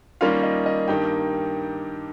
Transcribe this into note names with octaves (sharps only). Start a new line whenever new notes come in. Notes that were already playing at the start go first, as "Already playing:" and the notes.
D#3 G3 A#3 C#4 F4 F5
D#5
D#5
G2 D#3 A#3 G4 G5